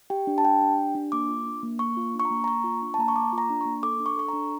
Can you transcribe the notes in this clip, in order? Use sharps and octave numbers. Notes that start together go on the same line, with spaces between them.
G4 G5
D4
A5
G4 G5
D4
G4
D4
A#3 D6
F4
D4
A#3
A#3 C#6
F4
D4
C#6
A#5
A#3
A#5
A#3 C#6
F4
D4
A5
A#3 A#5
C#6
A#3 D6
F4
A#5
D4
A#3 C#6
A4 D6
D4
C#6
A4 C#6
D4 A#5